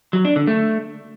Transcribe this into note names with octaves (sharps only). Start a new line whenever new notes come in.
F#3
D4
D3
A3